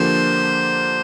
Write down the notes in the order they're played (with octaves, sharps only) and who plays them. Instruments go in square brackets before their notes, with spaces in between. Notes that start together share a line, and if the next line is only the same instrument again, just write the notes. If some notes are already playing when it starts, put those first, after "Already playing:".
Already playing: [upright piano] D3 F3 A#3 G4 [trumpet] C5